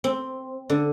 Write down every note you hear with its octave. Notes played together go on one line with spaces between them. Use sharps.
C4
D3